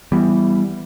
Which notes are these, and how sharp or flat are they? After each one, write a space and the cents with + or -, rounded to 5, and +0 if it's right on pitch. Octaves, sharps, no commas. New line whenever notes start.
E3 +10 G3 +0 B3 +0